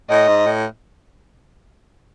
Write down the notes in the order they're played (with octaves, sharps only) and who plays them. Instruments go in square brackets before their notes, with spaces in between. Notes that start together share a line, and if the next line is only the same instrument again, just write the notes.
[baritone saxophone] A2 [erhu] D#5
[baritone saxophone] G#2
A2